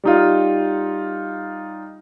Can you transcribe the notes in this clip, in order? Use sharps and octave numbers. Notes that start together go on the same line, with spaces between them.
G3 D#4 F4